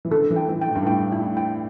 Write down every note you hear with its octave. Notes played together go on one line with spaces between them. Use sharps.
E3
D3 A4
E3
G5
E3
G5
A2
G2
A2 G5
E4
G5